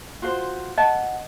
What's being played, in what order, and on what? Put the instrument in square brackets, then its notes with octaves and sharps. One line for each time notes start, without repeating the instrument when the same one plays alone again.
[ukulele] F4 F#4 C5
[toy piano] D#5 [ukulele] F#5 A5